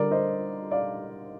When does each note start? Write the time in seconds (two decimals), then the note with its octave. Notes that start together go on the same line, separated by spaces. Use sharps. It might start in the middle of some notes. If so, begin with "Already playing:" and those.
Already playing: D3 G3 A#4 D5
0.11 C5 D#5
0.71 D5 F5